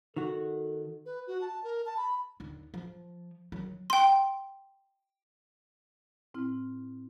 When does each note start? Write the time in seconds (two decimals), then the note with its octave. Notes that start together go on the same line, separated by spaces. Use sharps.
0.16 D#3 F#4 A4
1.06 B4
1.27 F#4
1.41 A5
1.64 A#4
1.86 A5
1.97 B5
2.40 D#2 D3
2.74 F3
3.52 D#3 F#3
3.90 G5 C6
6.34 A2 C4 E4 F6